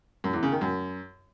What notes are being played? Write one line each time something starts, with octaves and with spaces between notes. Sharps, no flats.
F#2
E2
C#3
D#3
F#2